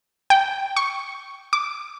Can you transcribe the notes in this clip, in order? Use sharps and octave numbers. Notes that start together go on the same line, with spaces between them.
G5
C#6
D6